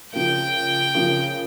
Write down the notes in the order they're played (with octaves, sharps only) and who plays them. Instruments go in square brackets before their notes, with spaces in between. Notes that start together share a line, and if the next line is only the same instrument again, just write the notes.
[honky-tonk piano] C#3 F3 A#3 [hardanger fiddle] G5
[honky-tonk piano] C#3 F3 A#3